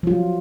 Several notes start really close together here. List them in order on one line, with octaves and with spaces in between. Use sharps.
F3 F4 F#3